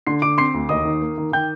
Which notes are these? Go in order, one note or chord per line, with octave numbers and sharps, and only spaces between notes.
D3 C6 C7
D3 D6 D7
C4 C6 C7
D2
D#2 D#5 D#6
D#3
A#3
D#3
D#3 G5 G6